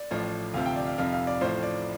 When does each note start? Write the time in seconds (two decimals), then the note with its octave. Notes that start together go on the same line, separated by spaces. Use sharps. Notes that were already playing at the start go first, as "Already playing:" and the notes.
Already playing: D5
0.11 A1 A2 F3
0.54 D2 C3 F3 F5
0.66 G5
0.76 D5
0.86 F5
0.98 F1 F2 C3 F3 F5
1.13 F5
1.27 D5
1.41 A1 A2 F3 C5
1.63 D5